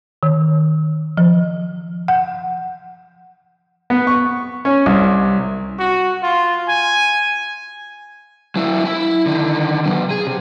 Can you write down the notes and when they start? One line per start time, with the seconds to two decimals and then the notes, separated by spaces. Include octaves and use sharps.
0.23 D#3
1.17 F3
2.08 F#5
3.90 B3
4.07 C#6
4.65 C#4
4.86 C2
5.79 F#4
6.23 F4
6.69 G#5
8.56 F#3 E4
8.85 E4
9.26 D3 D#3
9.85 C3 F#3
10.11 G#4
10.27 C3